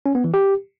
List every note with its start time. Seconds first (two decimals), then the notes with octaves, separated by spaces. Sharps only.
0.06 C#4
0.15 B3
0.24 E3
0.34 G4